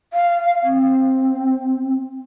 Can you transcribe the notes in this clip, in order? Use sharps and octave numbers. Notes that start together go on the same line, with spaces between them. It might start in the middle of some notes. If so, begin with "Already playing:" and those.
F5
C4